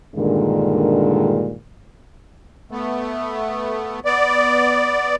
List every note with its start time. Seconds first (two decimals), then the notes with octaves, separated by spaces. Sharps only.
0.15 G2 A#2 D3 D#3 G#3
2.71 A3 B3
4.05 B3 D5